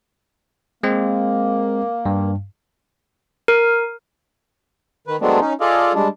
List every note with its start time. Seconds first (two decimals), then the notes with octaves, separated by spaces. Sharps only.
0.83 G#3 A#3 C4
2.06 G2
3.48 A#4
5.07 D#3 B4
5.21 F#3 G#3 A3 B3 C4 D4
5.41 C#4 D#4
5.61 F4 G#4 A4 D5 D#5 F5
5.94 G3 G#3 D4